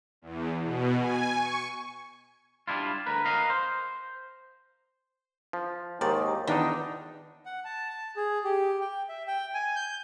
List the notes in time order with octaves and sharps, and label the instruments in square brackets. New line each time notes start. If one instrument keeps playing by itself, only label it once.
[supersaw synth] E2
B2
G#5
C#6
[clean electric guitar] G3 D4 E4 F4
D2 A#4 B4
A#4 B4 D#5 F5
C5
[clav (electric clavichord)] F3
[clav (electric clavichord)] D#2 G#2 D#3 [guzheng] D5
[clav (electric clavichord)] E2 D4 D#4 [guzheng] D#3
[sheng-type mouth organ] F#5
A5
A5
G#4
G4
G5
E5
G5
G#5
G6